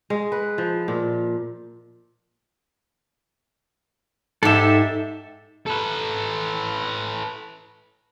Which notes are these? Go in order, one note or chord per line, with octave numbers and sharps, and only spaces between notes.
G#3
B4
F3
A#2
G#2 G4 A4 E5
A4 B4